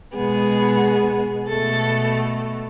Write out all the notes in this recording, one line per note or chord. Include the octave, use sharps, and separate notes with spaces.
B2 G#3 B3 G#4
B2 A3 A4